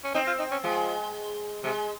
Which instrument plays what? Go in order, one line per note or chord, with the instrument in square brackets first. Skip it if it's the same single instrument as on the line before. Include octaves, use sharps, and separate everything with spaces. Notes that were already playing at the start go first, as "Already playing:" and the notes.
[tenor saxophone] C#4
[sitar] C4 [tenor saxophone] D#4
[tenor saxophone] F4
D#4
C#4
[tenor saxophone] F3 [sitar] G#3
[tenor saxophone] C3 [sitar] G#3